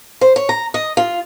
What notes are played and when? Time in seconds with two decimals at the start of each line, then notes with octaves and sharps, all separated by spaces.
0.21 C5
0.36 C#5
0.49 A#5
0.74 D#5
0.97 F4